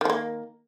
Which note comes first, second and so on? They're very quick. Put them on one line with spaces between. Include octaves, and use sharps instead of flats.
D#3 F3 A#3